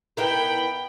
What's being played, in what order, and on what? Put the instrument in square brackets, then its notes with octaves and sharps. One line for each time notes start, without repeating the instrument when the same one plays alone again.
[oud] B3 E4 A#4 [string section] G5 B5